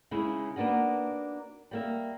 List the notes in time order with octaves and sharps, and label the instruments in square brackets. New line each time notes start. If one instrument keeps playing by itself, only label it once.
[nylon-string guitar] C#3 G#3 D#4 E4
A#3 B3 D4 D#4 F#4
G3 A#3 E5